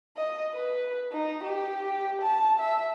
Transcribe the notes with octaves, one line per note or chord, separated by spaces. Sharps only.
D#5
B4
D#4
G4
A5
E5